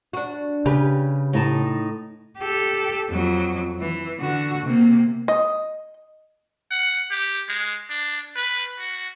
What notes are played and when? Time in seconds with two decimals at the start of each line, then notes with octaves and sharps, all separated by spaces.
0.13 D4 F#4
0.66 C#3 G4 B4
1.33 A2 D#4 A5
2.39 G4 A4
3.10 F2 F#3
3.80 E3
4.19 D3 F#4
4.66 C3 A#3
5.28 D#5
6.71 F#5
7.11 G4
7.48 G#3
7.89 D4
8.36 B4
8.79 F#4